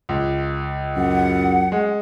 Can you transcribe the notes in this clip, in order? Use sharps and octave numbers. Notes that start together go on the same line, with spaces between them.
C#2
F#2 F#5
G#3